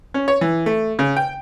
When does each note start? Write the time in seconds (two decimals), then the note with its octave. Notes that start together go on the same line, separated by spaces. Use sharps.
0.14 C#4
0.28 C#5
0.41 E3
0.66 A3
0.99 C#3
1.17 G5